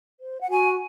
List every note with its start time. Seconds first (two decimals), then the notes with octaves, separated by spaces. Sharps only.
0.20 C5
0.40 F#5
0.50 F#4 G#5